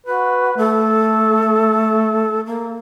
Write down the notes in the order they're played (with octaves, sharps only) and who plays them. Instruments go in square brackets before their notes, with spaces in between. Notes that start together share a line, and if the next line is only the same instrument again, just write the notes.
[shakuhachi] F#4 [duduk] B4
[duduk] A3 [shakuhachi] A4
[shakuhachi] A#3